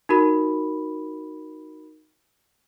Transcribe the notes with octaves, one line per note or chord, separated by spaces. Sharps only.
D#4 F#4 A#4 B5